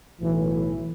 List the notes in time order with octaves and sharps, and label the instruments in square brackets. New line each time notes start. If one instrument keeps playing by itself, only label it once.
[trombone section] B1 A2 E3